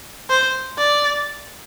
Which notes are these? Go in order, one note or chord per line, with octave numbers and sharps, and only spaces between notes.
C5
D5